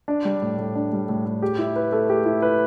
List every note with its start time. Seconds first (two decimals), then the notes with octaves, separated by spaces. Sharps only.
0.08 D4
0.25 G3
0.42 A2
0.58 A2
0.75 D4
0.93 G3
1.09 A2
1.25 A2
1.42 G4
1.58 E4
1.76 B4
1.92 A3
2.10 G4
2.25 E4
2.42 B4